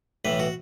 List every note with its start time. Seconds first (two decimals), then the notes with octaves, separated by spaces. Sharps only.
0.25 B1 A2 E3 B4
0.39 F#4